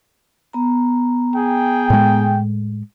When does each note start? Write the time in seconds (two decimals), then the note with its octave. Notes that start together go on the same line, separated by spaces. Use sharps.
0.53 B3 A#5
1.35 G#4 G5
1.90 A2 G#3